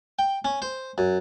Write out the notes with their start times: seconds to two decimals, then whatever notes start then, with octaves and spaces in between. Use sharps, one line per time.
0.19 G5
0.45 C#4
0.62 C5
0.98 F#2